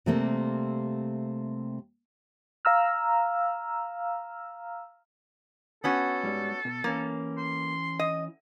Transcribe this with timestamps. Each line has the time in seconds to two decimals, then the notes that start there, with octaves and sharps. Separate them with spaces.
0.06 C3 G3 A3 A#3 C4
2.65 F5 A#5 E6 F6
5.84 B3 C#4 F#4 A4
6.23 G#2 G3
6.65 B2
6.84 E3 A#3 C#4
7.37 C6
7.99 D#5